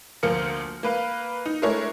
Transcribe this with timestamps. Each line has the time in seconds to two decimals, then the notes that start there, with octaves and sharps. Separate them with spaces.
0.23 D2 F3 A#3 A#4 F6 C#7
0.83 A#3 B4 F5
1.46 D#4
1.62 G#3 A3 D4 E4 A#4 C#5